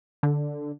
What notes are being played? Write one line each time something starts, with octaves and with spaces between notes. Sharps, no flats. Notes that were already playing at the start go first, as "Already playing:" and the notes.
D3